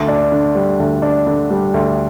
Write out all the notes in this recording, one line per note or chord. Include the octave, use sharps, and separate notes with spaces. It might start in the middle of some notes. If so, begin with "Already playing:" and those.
Already playing: D2
D4
D3
G3
D2
D4
D3
G3
D2